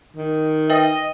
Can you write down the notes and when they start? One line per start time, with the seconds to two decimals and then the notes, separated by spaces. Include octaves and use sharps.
0.17 D#3
0.70 B4 D#5 E5 G5